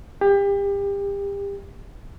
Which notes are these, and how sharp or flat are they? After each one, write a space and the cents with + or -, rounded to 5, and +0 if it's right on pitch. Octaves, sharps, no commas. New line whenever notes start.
G4 +30